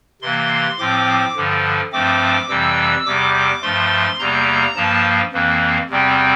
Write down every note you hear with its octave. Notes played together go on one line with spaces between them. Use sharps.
C3 E3 A#3 C6
A2 F3 C4 D6
G2 D3 F3
G2 F3 A3 C4 D6
F2 C3 E3 G3 E6
E2 C3 G3 D6
D6
G2 F3 A3 C6
E2 C3 G3 A#3 A#5
G2 F3 A#3 A5
F2 E3 A#3
E2 C3 G3 C4